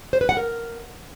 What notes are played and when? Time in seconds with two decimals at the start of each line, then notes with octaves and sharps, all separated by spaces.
0.13 C5
0.21 B4
0.29 F#5
0.37 A#4